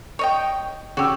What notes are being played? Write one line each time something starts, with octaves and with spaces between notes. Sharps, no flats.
C#5 D#5 G5
C#3 F#4 G4 E6